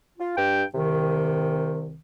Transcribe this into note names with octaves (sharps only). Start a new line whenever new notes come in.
F4
G2 G5
C2 C3 D#3